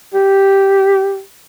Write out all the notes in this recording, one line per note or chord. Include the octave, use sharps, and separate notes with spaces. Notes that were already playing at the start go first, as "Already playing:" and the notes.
G4